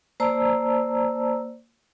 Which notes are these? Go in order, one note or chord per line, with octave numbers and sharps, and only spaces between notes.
A#3 C5 D5 A5 A#5 E6